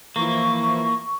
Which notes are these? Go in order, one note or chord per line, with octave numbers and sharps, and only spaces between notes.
E3 F3 A#3 E4 C#6